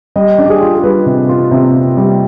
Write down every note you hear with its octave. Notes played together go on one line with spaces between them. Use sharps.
G3 D#5
D4
G4
G#4
F4
G#4
G3 B4
C3
F4
C3
F4
G3